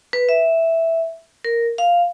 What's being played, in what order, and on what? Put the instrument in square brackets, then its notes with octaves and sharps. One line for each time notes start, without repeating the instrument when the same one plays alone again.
[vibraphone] B4
E5
A#4
F5